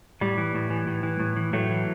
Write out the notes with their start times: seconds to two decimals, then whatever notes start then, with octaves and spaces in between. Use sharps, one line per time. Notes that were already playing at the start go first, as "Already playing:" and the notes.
0.21 A2 G3
0.38 E3
0.55 A2
0.70 E3
0.87 A2
1.03 E3
1.20 A2
1.36 E3
1.53 A2 F#3 A3
1.70 E3